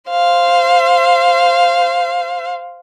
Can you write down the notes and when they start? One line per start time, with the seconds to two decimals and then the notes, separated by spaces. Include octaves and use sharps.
0.11 C5 F5